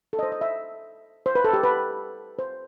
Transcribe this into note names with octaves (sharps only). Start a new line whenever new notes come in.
A4
D#5
C5
D#5
E5
C5
B4
A4
G4
B4
C5